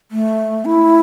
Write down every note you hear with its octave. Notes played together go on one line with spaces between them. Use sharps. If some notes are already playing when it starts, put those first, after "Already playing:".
A3
E4